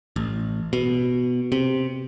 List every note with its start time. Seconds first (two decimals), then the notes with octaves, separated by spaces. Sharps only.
0.16 A1
0.73 B2
1.52 C3